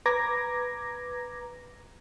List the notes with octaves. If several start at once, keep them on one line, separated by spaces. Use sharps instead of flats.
B4 A#5 D6 G#6 A#6